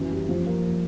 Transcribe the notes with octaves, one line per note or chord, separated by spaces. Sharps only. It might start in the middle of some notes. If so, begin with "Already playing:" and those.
Already playing: F#2 E3
G3
F3
A#3